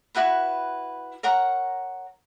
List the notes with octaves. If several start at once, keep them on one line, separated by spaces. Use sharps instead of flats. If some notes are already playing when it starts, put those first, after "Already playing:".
E4 F#4 B4 B5
A#4 C#5 F#5 A#5